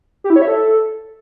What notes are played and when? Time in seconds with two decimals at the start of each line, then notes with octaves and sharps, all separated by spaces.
0.24 G4
0.30 E4
0.36 C#5
0.42 E5
0.47 A4